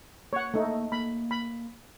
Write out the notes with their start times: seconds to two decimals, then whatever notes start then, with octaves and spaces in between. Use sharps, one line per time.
0.33 A#3 C#5 F#5
0.54 A3 D#4
0.92 A#3 B5
1.31 B5